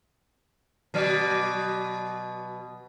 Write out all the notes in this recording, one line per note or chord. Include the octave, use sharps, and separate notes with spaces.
B2 F#3 D5